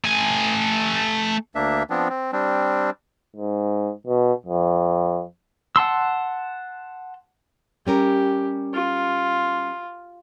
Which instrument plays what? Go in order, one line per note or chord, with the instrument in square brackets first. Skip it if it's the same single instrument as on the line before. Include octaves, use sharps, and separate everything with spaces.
[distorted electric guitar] A3 G#5
[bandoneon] D2 A#3 D4 E5
F3 B3 C4 D4
C4
G3 C4 D4
[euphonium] G#2
B2
F2
[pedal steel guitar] F#5 A5 C6 E6
[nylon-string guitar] G3 C#4 A#4 [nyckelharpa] G4
[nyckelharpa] F4